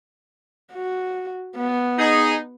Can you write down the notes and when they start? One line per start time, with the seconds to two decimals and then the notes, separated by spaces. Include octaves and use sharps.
0.73 F#4
1.56 B3
1.99 D#4 G#4